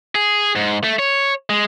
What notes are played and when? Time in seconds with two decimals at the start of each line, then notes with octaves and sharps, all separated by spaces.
0.15 G#4
0.56 G#2
0.84 A3
0.99 C#5
1.50 G#3